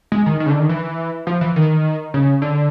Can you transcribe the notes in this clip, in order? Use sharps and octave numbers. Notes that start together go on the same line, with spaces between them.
G#3
D#3
D#3
C#3
D3
D#3
E3
F3
E3
D#3
C#3
D3